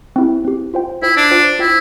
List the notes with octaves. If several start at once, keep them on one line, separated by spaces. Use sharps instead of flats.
C4 E4 G4
C4 E4 G4
F4 C5 G5
E4 F4 C5 G5
D4
F4 C5 G5
E4 F4 C5 G5